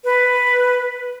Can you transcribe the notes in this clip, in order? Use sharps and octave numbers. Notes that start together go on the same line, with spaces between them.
B4